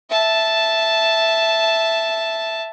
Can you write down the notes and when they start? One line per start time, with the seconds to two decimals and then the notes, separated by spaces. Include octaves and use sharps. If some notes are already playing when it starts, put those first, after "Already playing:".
0.10 E5 A5